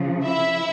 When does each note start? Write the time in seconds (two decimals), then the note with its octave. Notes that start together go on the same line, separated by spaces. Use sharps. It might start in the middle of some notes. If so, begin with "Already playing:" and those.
Already playing: C#3 F3
0.23 E4 E5